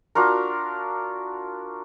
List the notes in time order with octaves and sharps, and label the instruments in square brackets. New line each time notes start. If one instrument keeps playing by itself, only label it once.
[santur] D4 F4 F#4 A#4